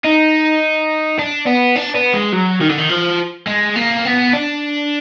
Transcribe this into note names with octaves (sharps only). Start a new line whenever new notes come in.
D#4
D4
B3
D4
B3
G#3
F#3
D#3
D3
D#3
F3
G#3
A#3
B3
D4